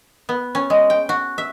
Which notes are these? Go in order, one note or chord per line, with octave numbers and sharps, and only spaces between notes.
B3
C#4
G#3
G5
F#4
E5